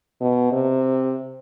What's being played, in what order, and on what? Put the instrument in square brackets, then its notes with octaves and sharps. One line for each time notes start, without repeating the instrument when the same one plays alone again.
[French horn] B2
C3